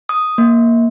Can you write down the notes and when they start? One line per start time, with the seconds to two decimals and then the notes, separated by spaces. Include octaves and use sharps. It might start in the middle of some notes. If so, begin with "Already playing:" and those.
0.09 D#6
0.38 A#3